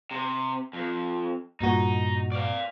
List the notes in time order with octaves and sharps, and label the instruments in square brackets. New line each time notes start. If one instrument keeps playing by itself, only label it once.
[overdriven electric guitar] C3
F2
[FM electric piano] G2 A#2 F#4 [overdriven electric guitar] D#4
[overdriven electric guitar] D5 F5